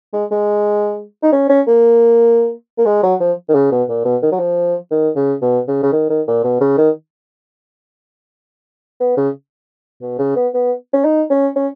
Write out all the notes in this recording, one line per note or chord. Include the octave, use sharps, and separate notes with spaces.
G#3
G#3
D#4
C#4
C#4
A#3
A#3
G#3
F#3
F3
D#3
C#3
B2
A#2
B2
D#3
F#3
F3
D#3
C#3
B2
C#3
C#3
D#3
D#3
A#2
B2
C#3
D#3
B3
C#3
B2
C#3
B3
B3
C#4
D#4
C#4
C#4